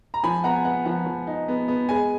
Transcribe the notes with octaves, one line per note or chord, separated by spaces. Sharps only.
A#5
F3 G#5 B5
B3 F#5 A#5
G#5
B3 F#5
F3 F#5
F3
D#4
B3
B3
G#3 G#5